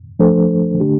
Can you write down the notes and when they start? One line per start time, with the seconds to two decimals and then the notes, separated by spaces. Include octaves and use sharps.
0.19 F3 A3 D4 A4 C5
0.80 D3 A3 D4 G4